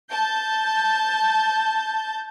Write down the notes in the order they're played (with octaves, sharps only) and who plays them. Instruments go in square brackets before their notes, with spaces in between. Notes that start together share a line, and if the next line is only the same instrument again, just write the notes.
[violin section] A5 G6